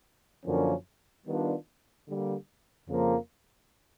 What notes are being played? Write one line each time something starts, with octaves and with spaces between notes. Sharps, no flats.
F#2 D3 F3 A#3 C#4
D#3 G3 B3 D4 F4
D3 G3 A#3
F2 C#3 F3 A#3